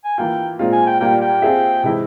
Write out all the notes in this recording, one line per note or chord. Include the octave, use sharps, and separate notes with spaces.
G#5
E3 A#3 F4 G5
A#2 G#3 C4 F4
G#5
G5
A#2 G3 A#3 F4 G5
G5
C4 F4 G#4 E5
C3 E3 G#3 E4 G4